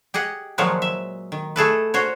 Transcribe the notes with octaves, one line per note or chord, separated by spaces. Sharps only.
G4 G#4 D#5 F#5
A#2 D#3 F3 F#3 G#3 F#4
E5
D#3
A3 G#4 A4 B4
A#2 F#4 C5 C#5